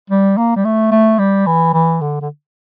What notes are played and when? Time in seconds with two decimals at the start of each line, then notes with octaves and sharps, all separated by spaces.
0.10 G3
0.37 A#3
0.56 G3
0.65 A3
0.92 A3
1.19 G3
1.46 E3
1.74 E3
2.01 D3
2.22 D3